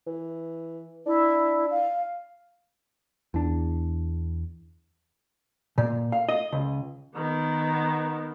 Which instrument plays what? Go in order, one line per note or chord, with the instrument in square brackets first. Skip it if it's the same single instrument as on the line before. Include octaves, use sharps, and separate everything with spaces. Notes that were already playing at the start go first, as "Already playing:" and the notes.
[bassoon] E3
[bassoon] D4 [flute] E4
[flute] F5
[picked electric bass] E2 D4
[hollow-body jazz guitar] A#2
F5
D#5
C#2
[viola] D#3 B3